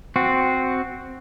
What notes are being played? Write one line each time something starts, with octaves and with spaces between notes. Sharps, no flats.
C4 F#4